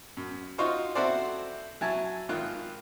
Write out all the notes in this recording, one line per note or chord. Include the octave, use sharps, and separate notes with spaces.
F#2
D#4 F4 F#4 C5 C#6
C4 E4 F#4 A4 C5 D5
F#3 E4 G#5 A5
G#1 D#3 F4 F#6